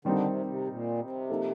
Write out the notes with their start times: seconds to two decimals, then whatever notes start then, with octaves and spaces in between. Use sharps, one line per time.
0.05 D3 D#3 G3 C4 D#4
0.26 C3
0.46 C3
0.67 A#2
0.98 C3
1.30 F3 A#3 D#4 A4